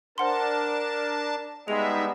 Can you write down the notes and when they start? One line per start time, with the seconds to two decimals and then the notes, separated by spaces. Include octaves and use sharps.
0.18 D4 A#4 C5 F#5 A5 C6
1.68 G3 G#3 B3 D#4 E5 F7